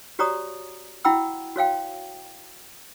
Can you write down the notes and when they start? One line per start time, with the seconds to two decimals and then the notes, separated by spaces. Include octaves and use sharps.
0.19 F#4 G4 C#5 D5 A#5 D#6
1.05 E4 F#4 F#5 G5 B5 E6
1.56 F#4 C#5 F5 G5